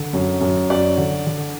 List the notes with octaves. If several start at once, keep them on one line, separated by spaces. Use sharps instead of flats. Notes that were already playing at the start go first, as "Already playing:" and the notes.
Already playing: D3
F#2
F#2
F#2 D5
D3
D3